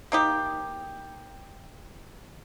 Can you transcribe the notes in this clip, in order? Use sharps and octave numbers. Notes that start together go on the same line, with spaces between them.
A#3 D#4 G4